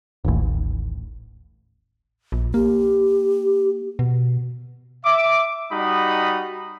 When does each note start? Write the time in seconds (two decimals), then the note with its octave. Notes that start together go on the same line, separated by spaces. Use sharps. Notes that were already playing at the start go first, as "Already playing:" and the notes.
0.24 D#1 A1
2.32 A#1
2.54 A#3 G4
3.99 B2
5.05 E5 D6
5.72 G3 D#4 F#4 D#5 B5 D#6